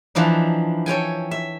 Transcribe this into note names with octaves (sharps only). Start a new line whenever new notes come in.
E3 F3 D4 D#4
A4 C#5 G5 G#5
E5